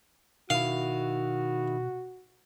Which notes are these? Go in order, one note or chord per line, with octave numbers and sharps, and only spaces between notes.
B2 D#3 E4 F#4 F5